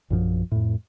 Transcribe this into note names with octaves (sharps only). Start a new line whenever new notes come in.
A#1 F#2 C#3 F3
F2 A2